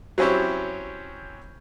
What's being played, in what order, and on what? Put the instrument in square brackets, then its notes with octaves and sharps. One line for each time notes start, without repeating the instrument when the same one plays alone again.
[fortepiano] F#3 C4 C#4 E4 G4